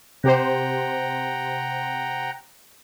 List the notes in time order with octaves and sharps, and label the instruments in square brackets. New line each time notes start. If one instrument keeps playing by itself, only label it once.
[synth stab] C3 G4 C5 [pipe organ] F#5 G5 A#5